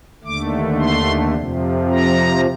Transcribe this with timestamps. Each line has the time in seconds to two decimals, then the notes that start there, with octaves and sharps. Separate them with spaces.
0.24 D#2 D3 A3 D6
0.80 C6
1.36 F2 C3 F3
1.91 A#5